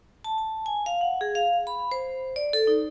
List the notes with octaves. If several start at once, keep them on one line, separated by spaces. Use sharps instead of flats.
A5
A5
G#5
F5
F#5
G#4
F5
B5
C5
D5
A4
D#4